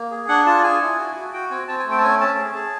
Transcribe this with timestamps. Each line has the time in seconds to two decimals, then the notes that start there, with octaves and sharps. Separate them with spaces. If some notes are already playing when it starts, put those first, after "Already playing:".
Already playing: A#3
0.11 G#4
0.28 D4 F#5
0.46 F4 A5
0.63 G#4 G#5
0.81 E4
0.99 F#4
1.15 F#4
1.33 F#4 G5
1.50 C4 G#5
1.68 C4 A5
1.80 G#5
1.85 A3
1.91 G5
1.98 A5
2.03 C#4 G#5
2.20 C#4 A5
2.38 G#4
2.55 G#4